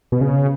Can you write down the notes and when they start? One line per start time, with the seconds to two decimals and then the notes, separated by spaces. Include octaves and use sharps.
0.12 B2
0.21 C#3